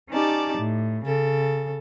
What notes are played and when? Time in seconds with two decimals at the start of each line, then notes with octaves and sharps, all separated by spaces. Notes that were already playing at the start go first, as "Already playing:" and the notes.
0.11 C#4 D#4 G4 D5 A5
0.59 A2
1.05 C#3 A4